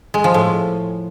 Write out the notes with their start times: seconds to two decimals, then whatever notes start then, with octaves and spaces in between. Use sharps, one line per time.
0.14 G#3
0.24 F3
0.34 A2